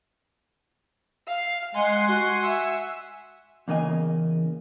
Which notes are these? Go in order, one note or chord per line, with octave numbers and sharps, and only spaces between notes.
F5
G#3 F#5 G#5 C6
F#4
E5
E2 C#3 A#3 D#5 G#5